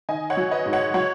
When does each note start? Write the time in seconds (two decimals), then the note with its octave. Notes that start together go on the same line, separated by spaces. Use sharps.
0.09 D#3 D#5 G#5
0.30 C#5 F#5
0.37 F#3
0.51 B4 D#5
0.66 G#2
0.73 C#5 F#5
0.94 F#3 C#5 F#5